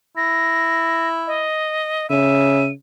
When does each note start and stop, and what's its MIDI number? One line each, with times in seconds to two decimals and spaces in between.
0.17 1.46 64
0.17 1.08 94
1.27 2.09 75
2.10 2.71 49
2.10 2.66 76
2.10 2.71 99